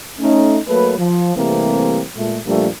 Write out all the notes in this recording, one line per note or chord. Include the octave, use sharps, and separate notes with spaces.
A3 C#4 D#4
F#3 A3 A#3 A4 B4
F3
C3 E3 G3 A3 A#3 C4
A#2 G#3 A3
A#2 F3 G3 A3 A#3 D4